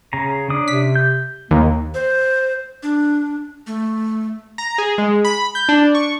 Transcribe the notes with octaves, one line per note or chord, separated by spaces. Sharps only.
C#3 A#5
C#4 D4 D#6
C3 B6
G6
D#2 A#3
C5
D4
A3
A#5
G#4
G#3
B5
G6
D4
C#6